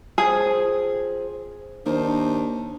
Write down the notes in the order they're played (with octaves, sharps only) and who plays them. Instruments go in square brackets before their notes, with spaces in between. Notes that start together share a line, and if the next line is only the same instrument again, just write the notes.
[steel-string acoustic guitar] F3 C4 C#4 [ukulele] G#4
[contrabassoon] D#2 [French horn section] D4 [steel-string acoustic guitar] A#4 C5 A5